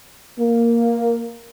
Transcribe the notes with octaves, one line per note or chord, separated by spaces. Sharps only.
A#3